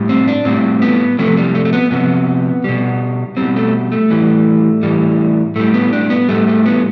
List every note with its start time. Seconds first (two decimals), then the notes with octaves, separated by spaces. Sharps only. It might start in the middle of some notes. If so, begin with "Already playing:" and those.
Already playing: A2 G3
0.09 C4
0.28 D4
0.45 A2 G3 C4
0.82 B3
1.19 C3 F3 A3
1.37 G3
1.55 A3
1.65 A3
1.73 B3
1.91 C3 F3 B3
2.64 B2 G3
3.37 B2 G3 C4
3.56 A3
3.92 A3
4.10 A2 E3 G3
4.83 A2 E3 G3
5.56 A2 G3 A3
5.74 B3
5.93 D4
6.10 B3
6.29 A2 G3 A3
6.47 A3
6.66 B3